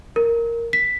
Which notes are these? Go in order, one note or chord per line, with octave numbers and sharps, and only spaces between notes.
A#4
B6